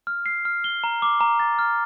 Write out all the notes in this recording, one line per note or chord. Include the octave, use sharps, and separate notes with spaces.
F6
C7
F6
G7
A#5
D6
A#5
A6
F6